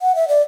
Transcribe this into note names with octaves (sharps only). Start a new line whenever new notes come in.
F#5
E5
D5